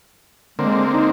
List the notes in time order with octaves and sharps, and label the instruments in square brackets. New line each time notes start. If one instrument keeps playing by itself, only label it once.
[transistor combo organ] D3 A#3 C4 [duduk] G#3
[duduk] D#4